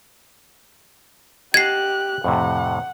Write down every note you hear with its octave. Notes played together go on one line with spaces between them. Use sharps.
G4 D#5 F#5 A5 F#6 G#6 C7
F2 A2 C3 F#5